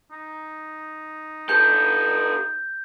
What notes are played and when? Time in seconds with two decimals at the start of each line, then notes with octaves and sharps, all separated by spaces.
0.12 D#4
1.49 G4 A4 G6